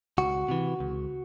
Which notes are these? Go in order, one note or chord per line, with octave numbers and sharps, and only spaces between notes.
C#2 F#4
C3 E3
C#2